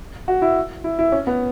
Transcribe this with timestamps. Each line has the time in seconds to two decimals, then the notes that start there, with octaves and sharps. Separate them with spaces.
0.28 F#4
0.42 E4
0.84 E4
0.99 E4
1.12 C#4
1.27 B3